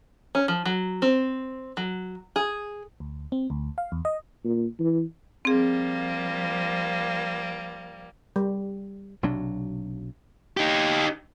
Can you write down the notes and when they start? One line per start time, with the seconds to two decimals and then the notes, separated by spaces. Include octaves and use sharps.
0.35 C#4
0.48 F3
0.65 F#3
1.02 C4
1.77 F#3
2.36 G#4
3.00 D2
3.32 C4
3.50 D2
3.78 F5
3.92 E2
4.05 D#5
4.44 A#2
4.79 E3
5.45 F3 G3 A#3 C4 G#4
8.36 G3
9.23 B1 C3 F#3 D4
10.57 D#4 G4